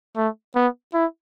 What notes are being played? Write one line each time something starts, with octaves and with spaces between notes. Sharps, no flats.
A3
B3
E4